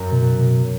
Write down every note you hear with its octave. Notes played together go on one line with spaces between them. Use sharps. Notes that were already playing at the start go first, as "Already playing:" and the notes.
Already playing: F#2
B2
B2